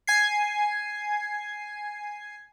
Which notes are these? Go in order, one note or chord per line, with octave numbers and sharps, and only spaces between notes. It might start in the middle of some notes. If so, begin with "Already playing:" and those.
G#5 G#6 C7